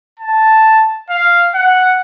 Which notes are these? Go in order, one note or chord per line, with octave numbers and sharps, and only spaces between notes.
A5
F5
F#5